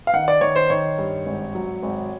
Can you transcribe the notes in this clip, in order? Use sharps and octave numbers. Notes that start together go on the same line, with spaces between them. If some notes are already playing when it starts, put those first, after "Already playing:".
F5
D#3 F#5
D5
D#3 C#5
C5
D#3 C#5
G2
G#1
F#3
G#1